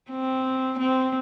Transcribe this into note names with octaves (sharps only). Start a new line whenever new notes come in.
C4
C4